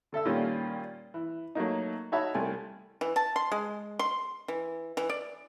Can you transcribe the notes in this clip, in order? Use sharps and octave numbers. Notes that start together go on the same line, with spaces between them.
D3 A4 E5 E6
A#2 D#3 G3 C#4 F4
E3
F#3 A3 A#3 D#4
D#4 F#4 C#5 E5 A5 B5
C2 A3 G#5
E3
A5
C6
G#3
C6
E3
E3
D5